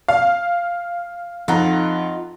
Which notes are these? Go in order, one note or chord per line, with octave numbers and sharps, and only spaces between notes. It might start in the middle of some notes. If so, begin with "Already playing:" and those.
F5
F2 D#4 F4 F#5 A#5